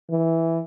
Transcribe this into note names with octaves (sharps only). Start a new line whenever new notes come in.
E3